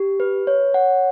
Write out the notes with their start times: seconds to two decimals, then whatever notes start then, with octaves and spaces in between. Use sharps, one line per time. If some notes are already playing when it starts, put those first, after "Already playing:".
Already playing: G4
0.20 B4
0.47 C#5
0.74 F#5